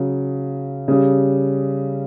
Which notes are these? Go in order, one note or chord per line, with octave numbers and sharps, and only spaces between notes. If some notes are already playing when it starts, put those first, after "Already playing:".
Already playing: C#3 F#3
C#3 G3